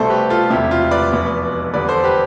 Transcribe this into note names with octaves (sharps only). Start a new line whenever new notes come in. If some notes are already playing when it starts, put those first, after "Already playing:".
Already playing: C2 B2 A3 A4 C5
G4 B4
F4 A4
E1 D2 C3 E4 G4
F4
B4 D5
F1 E2 B2 B3
E2 D3 G3 B3 B4 D5
A4 C5
G4 B4